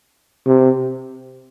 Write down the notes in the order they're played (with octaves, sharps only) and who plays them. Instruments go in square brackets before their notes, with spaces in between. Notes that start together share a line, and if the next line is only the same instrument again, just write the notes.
[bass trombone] C3